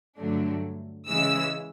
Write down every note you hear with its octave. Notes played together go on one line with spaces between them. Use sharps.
G2 D3 F#3 A3 D4
C#3 E3 G#3 E6